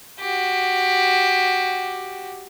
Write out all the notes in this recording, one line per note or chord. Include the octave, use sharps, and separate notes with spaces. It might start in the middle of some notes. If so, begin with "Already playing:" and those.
F#4 G4